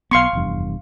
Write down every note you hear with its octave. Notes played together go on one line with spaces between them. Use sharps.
B1 B3 F5 C6 C#6
F1 E2 G2